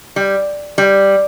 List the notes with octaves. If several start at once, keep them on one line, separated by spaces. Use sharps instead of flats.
G3
G3